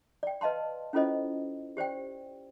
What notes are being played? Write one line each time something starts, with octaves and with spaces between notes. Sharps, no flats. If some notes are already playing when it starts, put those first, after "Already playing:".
D5 G5
B4 D#5 F5 A5 C6
C#4 E4 F4 A4 C5 D#5
G4 C5 D5 G5